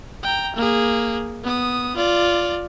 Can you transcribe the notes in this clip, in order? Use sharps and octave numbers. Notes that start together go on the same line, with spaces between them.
G5 A#5
A#3 G#4
B3 D#6
F4 D5